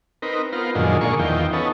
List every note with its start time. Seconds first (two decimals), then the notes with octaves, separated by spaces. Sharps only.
0.22 C4 D#4 A#4 B4
0.52 B3 F4 A#4 C5
0.75 F#2 A#2 D3 D#3 F3 G#3
1.01 A#2 D3 G#3 A#3 C#6
1.19 E2 D#3 F3 G5
1.53 B3 C#4 D#4 A4